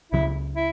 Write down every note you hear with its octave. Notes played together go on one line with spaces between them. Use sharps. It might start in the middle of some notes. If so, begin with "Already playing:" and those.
C#2 C#3 F#3 E4
E4